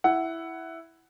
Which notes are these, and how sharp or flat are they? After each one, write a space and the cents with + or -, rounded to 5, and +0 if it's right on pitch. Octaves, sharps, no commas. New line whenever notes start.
E4 +0 F#5 +10